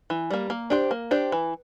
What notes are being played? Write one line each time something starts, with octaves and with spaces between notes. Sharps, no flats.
E3
G3 A#3
A#3
D4 G4 C5
A#3
D4 G4 C5
E3